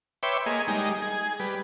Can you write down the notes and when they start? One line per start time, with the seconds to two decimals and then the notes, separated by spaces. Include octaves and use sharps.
0.23 B4 C#5 E5 G5 C6 D6
0.46 A#3 G#4 D#5
0.67 G3 G#3 D#4
1.02 G#4
1.40 G3 B4